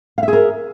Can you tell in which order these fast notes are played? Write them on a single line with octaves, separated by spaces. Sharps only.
F5 E5 G#4 A#4